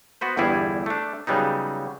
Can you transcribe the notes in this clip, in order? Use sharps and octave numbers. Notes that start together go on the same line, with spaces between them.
B3 F#4 B4 C5
G1 E2 G3 E4 G#4
A3 D4
C#3 F#3 G3 B3 D#4